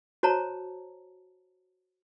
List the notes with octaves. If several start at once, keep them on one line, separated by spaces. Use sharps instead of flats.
F#4 C5 C#5 A5 A#5